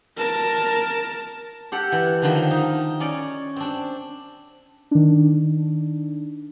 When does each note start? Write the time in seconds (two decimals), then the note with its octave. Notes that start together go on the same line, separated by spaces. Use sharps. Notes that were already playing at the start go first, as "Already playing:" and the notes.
0.17 A#4 A5
1.72 G4 A4 F#5
1.92 E3
2.22 D3 D#3 F3
2.51 D#4
3.00 C#4 C#5 D5
3.56 C4 D4
4.91 D#3 D4